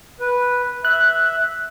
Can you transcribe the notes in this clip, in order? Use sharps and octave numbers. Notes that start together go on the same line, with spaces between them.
B4
E5 F#6